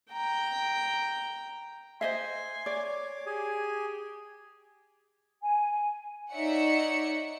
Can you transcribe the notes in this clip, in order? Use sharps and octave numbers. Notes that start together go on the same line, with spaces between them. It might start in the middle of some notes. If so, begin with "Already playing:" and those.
G5 A#5
C5 D#5 E5 G#5 C6
C#5 D5 D6
G4 G#4 G#5
G#5
D#4 C#5 D5 E5 F#5 C#7